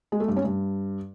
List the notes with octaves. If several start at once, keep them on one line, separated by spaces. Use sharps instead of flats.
G#3
A3
G2
C#4
G2